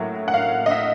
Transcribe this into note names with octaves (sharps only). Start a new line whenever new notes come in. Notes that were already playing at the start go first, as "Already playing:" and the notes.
Already playing: A2 F#3 A#3
F#5
F5
D#5
E5